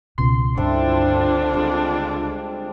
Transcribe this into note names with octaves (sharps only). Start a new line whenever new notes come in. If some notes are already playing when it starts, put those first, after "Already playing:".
C#2 B2 D#3 C6
G2 D3 C4 D4 E4 F4 A4
G3 G#3 C4